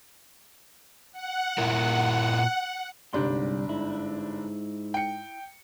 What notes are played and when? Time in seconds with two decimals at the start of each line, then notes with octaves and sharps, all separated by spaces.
1.12 F#5
1.58 A#2 E4 A#4
3.13 G1 C2 G#2 D4 G4 C6
3.69 G#2 E4
4.94 G5 C#7